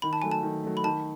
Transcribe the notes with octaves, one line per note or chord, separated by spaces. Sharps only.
D#3 B5
A5
F#3 A3 G#5
A5
D#3
F#3 A3
B5
D#3 A5